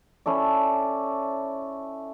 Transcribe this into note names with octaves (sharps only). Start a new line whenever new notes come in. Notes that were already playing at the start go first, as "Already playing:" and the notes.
C#4 E4 A4 D5